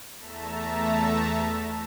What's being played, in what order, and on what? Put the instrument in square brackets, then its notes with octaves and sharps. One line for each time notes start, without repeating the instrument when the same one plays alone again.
[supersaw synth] E2 A3 E5 A5 A#5